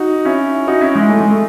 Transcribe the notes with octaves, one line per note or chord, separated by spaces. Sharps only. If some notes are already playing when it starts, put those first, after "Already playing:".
Already playing: D#4 F#4
C#4 E4
D#4 F#4
C#4 E4
G#3
A3
G#3
A3